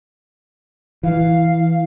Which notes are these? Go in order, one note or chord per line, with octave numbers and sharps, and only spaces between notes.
E3 F5